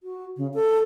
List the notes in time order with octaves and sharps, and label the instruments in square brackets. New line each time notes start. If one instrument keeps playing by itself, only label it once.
[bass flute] F#4
C#3
A4